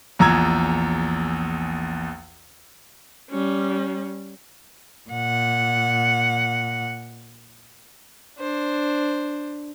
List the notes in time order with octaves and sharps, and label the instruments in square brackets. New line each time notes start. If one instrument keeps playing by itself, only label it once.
[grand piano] A#1 E2 A#5 E6 G#6
[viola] G3 C#4
[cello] A#2 F#5
[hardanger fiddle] D4 C5